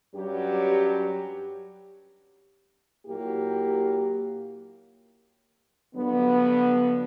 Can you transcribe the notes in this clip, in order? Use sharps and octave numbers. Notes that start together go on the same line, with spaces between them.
G2 F#3 C#4 G4
A#2 F#3 A#3 E4 G4
G2 D3 F#3 B3